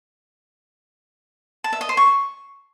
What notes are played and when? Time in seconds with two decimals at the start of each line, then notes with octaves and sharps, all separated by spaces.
1.64 A5
1.73 E5
1.81 D#5
1.89 C5
1.97 C#6